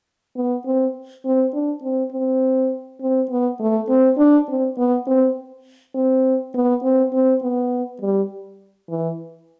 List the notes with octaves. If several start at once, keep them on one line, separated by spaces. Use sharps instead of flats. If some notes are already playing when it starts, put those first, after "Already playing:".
B3
C4
C4
D4
C4
C4
C4
B3
A3
C4
D4
C4
B3
C4
C4
B3
C4
C4
B3
G3
E3